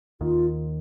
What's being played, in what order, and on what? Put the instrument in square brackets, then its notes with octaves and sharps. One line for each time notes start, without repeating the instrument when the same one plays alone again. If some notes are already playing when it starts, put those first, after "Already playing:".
[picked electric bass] D#2 D#3 [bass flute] F4